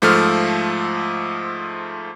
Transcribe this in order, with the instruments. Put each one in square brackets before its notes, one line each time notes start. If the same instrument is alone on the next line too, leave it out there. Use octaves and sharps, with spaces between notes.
[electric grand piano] G#2 F3 A3 A4 F6